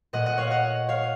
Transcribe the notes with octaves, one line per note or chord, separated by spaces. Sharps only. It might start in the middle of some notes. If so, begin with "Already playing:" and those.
A#2 A3 D#5 F#5
D#5 F#5
C#5 F5
D#5 F#5
C#5 F5